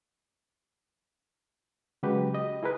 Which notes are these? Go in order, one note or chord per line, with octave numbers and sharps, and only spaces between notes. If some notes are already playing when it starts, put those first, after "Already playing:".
C#3 F#3 G#3 F#4 G4 B4
G4 D#5
E4 G#4 A#4 B4